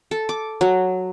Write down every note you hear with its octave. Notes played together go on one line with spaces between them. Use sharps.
A4
D6
F#3